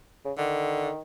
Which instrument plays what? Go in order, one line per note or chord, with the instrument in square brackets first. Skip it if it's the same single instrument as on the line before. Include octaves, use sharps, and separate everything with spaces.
[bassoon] C#3
[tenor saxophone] D3 [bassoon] D#3